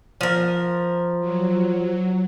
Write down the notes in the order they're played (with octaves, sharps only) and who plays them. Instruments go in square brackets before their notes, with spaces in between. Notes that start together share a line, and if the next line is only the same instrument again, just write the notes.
[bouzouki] F3 A#4
[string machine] F#3